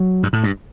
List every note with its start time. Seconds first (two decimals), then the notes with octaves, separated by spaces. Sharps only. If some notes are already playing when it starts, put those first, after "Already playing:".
Already playing: F#3
0.23 G2
0.33 A2
0.44 G2